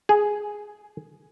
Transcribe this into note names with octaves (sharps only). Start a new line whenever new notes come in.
G#4